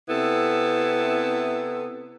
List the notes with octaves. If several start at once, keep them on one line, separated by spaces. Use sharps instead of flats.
C3 B3 E4 A4